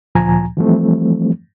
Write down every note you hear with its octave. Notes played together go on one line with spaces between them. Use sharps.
D2 A#2 F3 G#5 A#5
E3 F3 G3 A3 C4